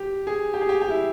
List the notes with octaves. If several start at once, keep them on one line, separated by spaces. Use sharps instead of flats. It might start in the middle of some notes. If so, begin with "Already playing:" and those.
Already playing: G4
G#4
G4
G#4
G4
G4
E4